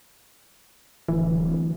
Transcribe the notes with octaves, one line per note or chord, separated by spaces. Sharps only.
D1 E3